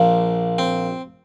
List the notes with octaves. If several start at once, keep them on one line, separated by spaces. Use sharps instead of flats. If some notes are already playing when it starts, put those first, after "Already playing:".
Already playing: A#1 A#2 F3
C4